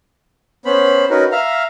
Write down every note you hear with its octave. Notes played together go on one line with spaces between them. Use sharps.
B3 C#4 C5 B5
C#4 D#4 F#4 A#4 B4
E5 F5 A#5 F6